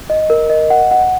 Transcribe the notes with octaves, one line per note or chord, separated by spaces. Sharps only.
D#5
A#4
D#5
F#5
F#5